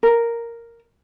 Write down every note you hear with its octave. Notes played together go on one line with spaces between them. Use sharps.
A#4